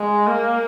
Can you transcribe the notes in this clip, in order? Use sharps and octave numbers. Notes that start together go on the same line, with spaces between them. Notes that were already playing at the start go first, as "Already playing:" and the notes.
Already playing: G#3
A#3